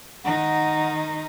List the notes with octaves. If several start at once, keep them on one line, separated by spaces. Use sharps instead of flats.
D#3 D#4 F#5